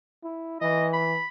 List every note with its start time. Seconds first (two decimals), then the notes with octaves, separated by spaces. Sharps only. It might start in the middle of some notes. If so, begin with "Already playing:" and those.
0.23 E4
0.61 E3 D#5
0.93 B5